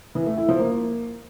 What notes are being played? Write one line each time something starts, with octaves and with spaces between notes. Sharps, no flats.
E3
A3
E4
F3
A#3